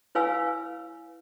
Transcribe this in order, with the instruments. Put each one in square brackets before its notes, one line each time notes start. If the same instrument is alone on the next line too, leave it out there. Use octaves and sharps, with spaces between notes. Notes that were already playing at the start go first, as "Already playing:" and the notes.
[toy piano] E4 B4 C#5 F5 G#5 E6